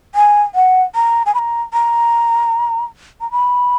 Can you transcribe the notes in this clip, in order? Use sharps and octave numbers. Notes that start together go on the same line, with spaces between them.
G#5
F#5
A#5
G#5
B5
A#5
A#5
A#5
B5